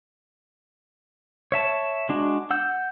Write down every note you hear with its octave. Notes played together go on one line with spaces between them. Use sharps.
C#5 E5 A5
G#3 D4 F#4
F#5 E6 G6